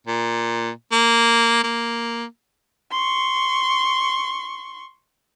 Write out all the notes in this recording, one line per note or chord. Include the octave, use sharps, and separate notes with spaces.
A#2
A#3
A#3
C6 C#6